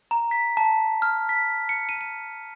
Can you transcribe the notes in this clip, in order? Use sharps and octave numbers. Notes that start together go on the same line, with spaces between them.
A#5
B6
A5
F6
B6
C#7
D#7
D#7